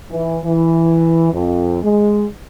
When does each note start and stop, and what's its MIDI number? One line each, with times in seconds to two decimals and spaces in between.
0.11 0.37 52
0.44 1.32 52
1.33 1.80 41
1.82 2.24 56